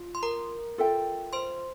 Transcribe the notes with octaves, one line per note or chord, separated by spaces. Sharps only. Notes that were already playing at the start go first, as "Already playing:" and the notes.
Already playing: F4
C6
A#4 A#5
F4 A4 E5 G5
C5 C6